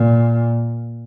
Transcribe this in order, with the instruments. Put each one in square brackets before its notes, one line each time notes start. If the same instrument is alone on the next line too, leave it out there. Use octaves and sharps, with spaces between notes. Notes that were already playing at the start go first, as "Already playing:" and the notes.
Already playing: [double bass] A#2